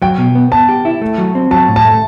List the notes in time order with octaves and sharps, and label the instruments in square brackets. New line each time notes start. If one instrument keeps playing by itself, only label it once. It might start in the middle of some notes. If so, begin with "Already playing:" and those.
[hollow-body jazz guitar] F#3 [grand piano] G5
[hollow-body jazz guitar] B2
B3
[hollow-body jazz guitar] B3 [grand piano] A5
[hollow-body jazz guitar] G4
E4
A3
F#3
C4
[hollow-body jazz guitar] F#3 [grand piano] A5
[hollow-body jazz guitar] A2
[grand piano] A5
[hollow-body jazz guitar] A3